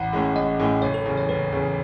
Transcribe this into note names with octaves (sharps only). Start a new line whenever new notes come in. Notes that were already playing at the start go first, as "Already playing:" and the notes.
Already playing: A1 F#5
A2 G#3 C#4
A1 D#5
A2 G#3 C#4
F#1 C#5
A4
E2 C#3
C#5
F#1 B4
E2 C#3